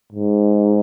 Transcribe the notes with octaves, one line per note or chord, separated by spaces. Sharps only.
G#2